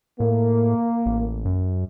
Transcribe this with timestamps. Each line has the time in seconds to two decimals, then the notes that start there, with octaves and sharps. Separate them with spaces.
0.20 A2 A#3
1.06 A1
1.45 F#2